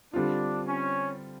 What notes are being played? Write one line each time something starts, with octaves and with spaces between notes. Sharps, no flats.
D3 G3 C4 D4 F4
C#4